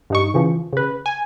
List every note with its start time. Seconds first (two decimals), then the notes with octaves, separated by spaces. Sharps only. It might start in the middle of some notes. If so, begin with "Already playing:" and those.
0.10 G2 D#4 C#6
0.34 C#3 E3 F3
0.73 C#3 B4
1.06 G#5